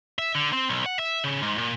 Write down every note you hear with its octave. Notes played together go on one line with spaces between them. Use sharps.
E5
D3
C4
B1
F#5
E5
C#3
G#2
A#2